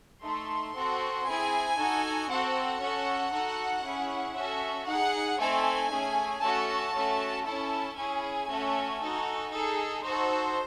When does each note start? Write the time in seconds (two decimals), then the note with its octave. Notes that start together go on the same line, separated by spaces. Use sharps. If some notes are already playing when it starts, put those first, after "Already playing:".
0.23 A3 D#4 A4 C6
0.75 C4 F#4 A4
1.26 C4 E4 G#4 G#5
1.78 D#4 F#4 A4
2.30 C4 F#4 A4 F#5
2.81 C#4 F#4 A4
3.32 D#4 F#4 A4
3.84 C#4 E4 G#4
4.35 C#4 F#4 A4 E5
4.88 D#4 G#4 F#5
5.39 A3 C4 D#4 A4 G#5
5.91 A3 C#4 G#4
6.42 A3 C#4 F#4 A4 A5
6.94 A3 C#4 F#4 A4
7.45 C#4 E4 A4 A5
7.97 C#4 E4 G#4 G#5
8.49 A3 C#4 F#4 A4
9.01 D#4 F#4 A4
9.51 D#4 G#4 A4
10.03 D#4 F#4 A4 C5